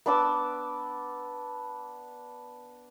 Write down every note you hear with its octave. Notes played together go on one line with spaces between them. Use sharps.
B3 D4 D6 E6